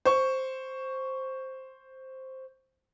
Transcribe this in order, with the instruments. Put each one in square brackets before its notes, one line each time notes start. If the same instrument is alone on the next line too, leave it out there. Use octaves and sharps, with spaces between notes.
[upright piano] C5 C#6